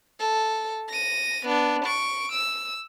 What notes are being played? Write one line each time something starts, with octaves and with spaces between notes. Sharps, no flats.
A4
A#6 D#7
B3 D4
C#6 D7
E6